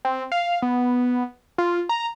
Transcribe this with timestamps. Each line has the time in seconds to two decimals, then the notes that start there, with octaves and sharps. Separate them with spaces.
0.05 C4
0.32 F5
0.62 B3
1.58 F4
1.89 A#5